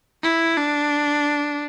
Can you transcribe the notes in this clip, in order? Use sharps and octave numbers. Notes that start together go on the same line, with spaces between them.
E4
D4